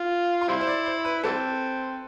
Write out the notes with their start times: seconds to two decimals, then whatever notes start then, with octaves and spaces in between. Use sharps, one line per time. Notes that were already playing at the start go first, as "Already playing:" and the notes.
Already playing: F4
0.41 C6
0.48 G3 C4 E4 B5
0.61 C5
0.67 D5
0.86 C5
1.05 B4
1.23 E3 G3 C4 A4